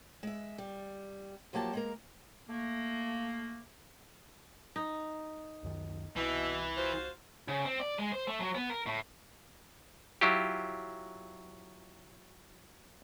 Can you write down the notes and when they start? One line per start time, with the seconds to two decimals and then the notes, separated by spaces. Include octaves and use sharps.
0.23 G#3 E5
0.58 G3
1.53 F3 F#3 A#3 G4 A5
1.73 G#3 A#3 A#4
2.49 A3 A#3
4.76 D#4
5.63 C#2 F#2 D#3
6.16 C2 B2 E3 E4
6.77 F4 F#4 C5
7.48 C#3
7.65 C4
7.80 D5
7.99 G#3
8.12 C5
8.27 A3
8.40 F#3
8.55 B3
8.70 A#4
8.86 A2
10.21 F#3 E4 F4 G4